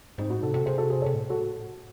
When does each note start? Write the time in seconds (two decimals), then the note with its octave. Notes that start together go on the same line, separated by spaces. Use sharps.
0.18 G#2 C4 D#4
0.30 A2 D#4 F#4
0.43 C3 F#4 A4
0.49 C#3
0.54 C3 F#4 A4
0.66 C3 G#4 C5
0.78 F#4 A4
0.90 G#4 C5
1.02 A4 C#5
1.06 C3
1.14 A2
1.30 F#4 A4